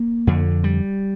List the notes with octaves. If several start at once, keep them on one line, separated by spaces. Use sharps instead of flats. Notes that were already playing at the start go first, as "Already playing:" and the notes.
Already playing: A#3
F2 D3
G3